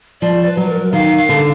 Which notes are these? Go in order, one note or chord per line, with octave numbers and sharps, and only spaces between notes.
F3 D5
B4
F#3 B4
A#4
D#3 F5
F5
D3